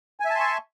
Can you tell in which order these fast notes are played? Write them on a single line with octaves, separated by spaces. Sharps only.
G#5 E5 A5 C6 C#6